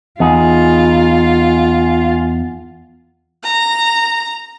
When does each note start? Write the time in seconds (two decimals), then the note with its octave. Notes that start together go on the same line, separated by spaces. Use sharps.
0.20 E2 D#4 F4 G#4
3.44 A#5